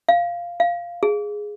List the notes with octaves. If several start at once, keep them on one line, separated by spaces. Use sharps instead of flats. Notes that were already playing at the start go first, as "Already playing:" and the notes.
F5
F5
G#4